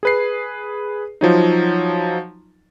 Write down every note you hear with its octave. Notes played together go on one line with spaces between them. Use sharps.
G#4 B4 C7
F3 F#3 D#4